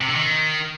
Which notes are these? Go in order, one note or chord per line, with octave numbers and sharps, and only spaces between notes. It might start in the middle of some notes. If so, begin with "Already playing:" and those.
C3
D3
D#3